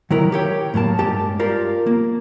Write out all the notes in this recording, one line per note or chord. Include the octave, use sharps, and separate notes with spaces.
D#3 F#3 E4 A#4
G4 C#5 G5
A2 F#3 A#3 A5
G2 G#3 G4 A5
F4 G4 A#4 D5
A#3